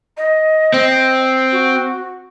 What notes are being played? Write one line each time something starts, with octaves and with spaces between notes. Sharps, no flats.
D#5
C4
F#4